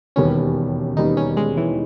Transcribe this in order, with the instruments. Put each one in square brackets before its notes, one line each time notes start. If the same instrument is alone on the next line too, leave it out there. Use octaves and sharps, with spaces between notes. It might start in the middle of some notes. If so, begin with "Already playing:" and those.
[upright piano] E1 D#2 D#3 G3 B3 [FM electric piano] C#4
[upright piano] E1 D#2 D#3 G3 B3 [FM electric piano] D#4
[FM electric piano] C#4
G#3
E3